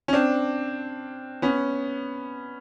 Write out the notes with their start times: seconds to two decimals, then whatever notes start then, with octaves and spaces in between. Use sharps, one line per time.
0.08 C#4
0.13 C4 D4
1.42 B3 C#4